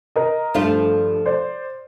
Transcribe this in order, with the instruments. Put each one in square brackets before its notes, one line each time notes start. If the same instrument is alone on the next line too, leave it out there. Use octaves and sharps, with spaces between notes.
[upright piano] A#4 D#5
[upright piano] G2 [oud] F3 A3 F4
[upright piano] C5 D5